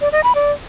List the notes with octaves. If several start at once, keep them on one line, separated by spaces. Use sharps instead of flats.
D5
D#5
B5
D5